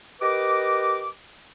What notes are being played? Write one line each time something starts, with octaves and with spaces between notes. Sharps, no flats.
G4 A#4 B4 D#5 D6